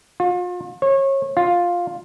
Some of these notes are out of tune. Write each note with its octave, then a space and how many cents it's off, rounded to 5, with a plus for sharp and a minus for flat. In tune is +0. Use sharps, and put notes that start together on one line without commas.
F4 +40
C#5 -25
F4 +10